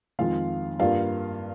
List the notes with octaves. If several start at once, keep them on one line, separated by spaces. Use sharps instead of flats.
F2 D#3 G#3 F4 F5
G2 G3 A#3 F4 F5